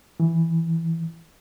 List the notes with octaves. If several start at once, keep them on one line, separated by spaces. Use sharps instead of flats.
E3